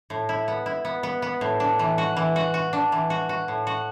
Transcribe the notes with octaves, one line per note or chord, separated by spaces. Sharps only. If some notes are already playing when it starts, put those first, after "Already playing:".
A2
E4
B3
E4
B3
B3
B3
A2
D4
E3
F#4
E3
F#4
F#4
D4
E3
F#4
F#4
A2
F#4